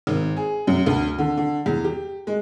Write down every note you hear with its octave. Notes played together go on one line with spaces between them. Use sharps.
G#1
G#4
F#2
D2
D3
D3
E2
G4
G#3